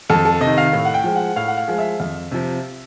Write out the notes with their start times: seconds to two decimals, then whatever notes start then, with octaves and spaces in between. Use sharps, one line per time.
0.09 F2 A4
0.25 A4
0.40 C3 D#3 D#5
0.57 F5
0.73 A2
0.85 F#5
0.94 G5
1.04 F3 G#3
1.16 F#5
1.36 A2 F5
1.48 F#5
1.58 F5
1.68 F3 G#3
1.78 E5
2.00 F2
2.31 C3 F3